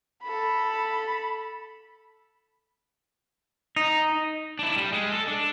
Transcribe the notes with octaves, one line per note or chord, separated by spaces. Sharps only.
A4 B5
D#4
D4 E4
G3
G#3
A4
D4